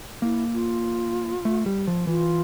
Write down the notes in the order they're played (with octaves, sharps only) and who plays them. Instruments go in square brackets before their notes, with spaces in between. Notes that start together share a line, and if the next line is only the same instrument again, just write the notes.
[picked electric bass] A#3 [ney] E4
[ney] F4
[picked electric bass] A3
G3
F3
[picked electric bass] E3 [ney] F4